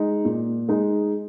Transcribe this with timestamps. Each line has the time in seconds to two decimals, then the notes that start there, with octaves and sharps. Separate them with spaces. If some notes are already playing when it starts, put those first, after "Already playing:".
Already playing: G#3 D#4
0.25 A#2
0.69 G#3 D#4